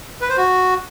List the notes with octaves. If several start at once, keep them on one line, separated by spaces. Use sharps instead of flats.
B4
C5
F#4